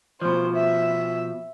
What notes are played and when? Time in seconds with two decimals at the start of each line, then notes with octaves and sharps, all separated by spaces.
0.22 B2 F3 C5
0.55 E5